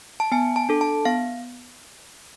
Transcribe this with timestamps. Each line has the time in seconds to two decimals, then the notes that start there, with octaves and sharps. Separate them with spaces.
0.20 A5
0.32 B3 G#5
0.56 A5
0.69 D4 A4
0.81 A5
1.05 B3 F5